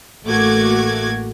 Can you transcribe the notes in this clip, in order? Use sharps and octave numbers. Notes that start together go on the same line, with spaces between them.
A1 A3 A#3 F#4 D6 G#6